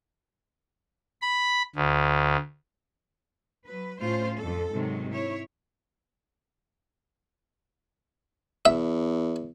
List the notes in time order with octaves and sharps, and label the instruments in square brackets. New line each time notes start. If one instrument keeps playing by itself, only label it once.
[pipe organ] B5
D2
[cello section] F#3 B4
A2 A3 C#4 F4 C5
F2 A4
G#2 C3 D#3 F#3
E4 C#5
[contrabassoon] E2 [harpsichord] E5